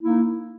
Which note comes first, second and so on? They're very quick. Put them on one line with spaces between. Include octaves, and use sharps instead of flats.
E4 A#3 D#4